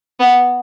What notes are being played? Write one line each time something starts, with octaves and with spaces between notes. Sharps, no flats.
B3